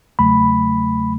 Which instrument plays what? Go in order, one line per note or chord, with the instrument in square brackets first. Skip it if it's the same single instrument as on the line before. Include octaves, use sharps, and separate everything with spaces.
[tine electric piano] E2 C#3 F#3 A3 B5